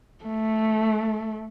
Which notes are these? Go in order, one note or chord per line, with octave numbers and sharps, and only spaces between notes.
A3